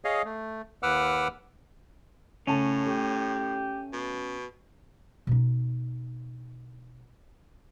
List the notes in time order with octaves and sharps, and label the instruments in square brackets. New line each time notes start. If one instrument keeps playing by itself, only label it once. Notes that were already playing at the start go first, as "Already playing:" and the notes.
[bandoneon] G#4 C#5 D#5 F5
A3
D#2 B4 F#5 D6 E6 F6
[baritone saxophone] A2 [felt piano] C#3 A3 A5 [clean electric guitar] C#4
[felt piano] A3 [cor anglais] G4
[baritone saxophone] B2
[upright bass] B2 D#4